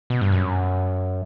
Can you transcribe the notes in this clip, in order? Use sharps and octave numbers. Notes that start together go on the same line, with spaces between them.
B2
G2
F#2